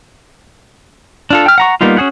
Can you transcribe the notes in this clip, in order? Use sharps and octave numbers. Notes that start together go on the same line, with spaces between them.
D4 F4 A4
G5 F6
F#5 A#5 C#6
G3 A#3 B3 D#4 F4
C#4 F#4 G#4 F#5